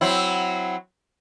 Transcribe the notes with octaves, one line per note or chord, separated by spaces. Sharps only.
F#3 C4 E4